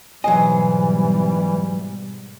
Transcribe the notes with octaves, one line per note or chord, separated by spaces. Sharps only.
G#2 B2 E3 F#3 G3 C5 D#5 G#5